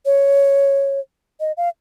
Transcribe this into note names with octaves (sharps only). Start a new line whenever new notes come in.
C#5
D#5
F5